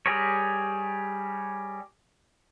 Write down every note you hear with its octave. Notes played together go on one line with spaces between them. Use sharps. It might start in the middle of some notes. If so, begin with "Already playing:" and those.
G3 G4 G#4 A#4 C#5